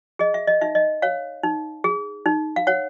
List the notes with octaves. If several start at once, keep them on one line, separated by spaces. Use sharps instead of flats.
G#4 D#5
E5
D#5
D#4 E5
D#5
C#5 F5
D#4
G#4
D#4
F5
C#5 F#5